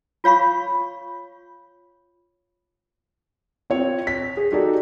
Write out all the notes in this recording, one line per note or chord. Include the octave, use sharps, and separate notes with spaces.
F4 C#5 F5 B5 C#6
C4 F4 C#5
B6
G#4
D#4 F#4 G4 A4 D5